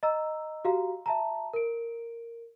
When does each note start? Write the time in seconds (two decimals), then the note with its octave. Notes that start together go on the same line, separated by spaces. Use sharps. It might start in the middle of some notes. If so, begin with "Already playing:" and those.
0.03 D#5 A#5 E6
0.65 F#4 G4 F5 A#5
1.06 E5 A5 A#5
1.53 A#4 D7